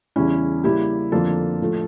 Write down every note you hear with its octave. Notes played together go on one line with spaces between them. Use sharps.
E2 C#3 G3 C#4 E4
C#3 G3 A#3 E4 G4
F2 D3 F3 A#3 F4 A4
A2 F3 A3